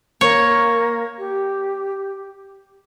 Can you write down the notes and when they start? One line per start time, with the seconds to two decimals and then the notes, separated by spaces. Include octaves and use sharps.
0.21 A#3 C#5
1.19 G4